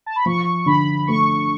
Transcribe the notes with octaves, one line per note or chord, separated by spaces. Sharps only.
A5
B5
F3 C#6
D3 B5
A3 C#6